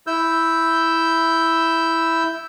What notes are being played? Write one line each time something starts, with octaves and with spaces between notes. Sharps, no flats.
E4 E6 G6